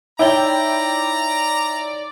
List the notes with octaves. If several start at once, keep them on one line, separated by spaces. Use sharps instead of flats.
D#4 E4 C#5 D5 G5 A#5 G7